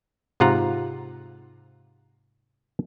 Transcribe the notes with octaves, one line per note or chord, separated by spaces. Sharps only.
G#2 C3 F4 F#5 A#5